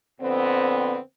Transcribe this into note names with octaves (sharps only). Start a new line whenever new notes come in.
F2 D3 B3 C4